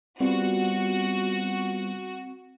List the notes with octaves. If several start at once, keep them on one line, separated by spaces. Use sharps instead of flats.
G3 B3 C4 F4 F#4